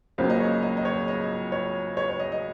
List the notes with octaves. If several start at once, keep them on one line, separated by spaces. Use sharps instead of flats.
C#2 C#3 F#3 A#3 C5
D#5
C#5
D#5
D#5
C#5
D#5
C#5
C#5
C#5
D#5
D#5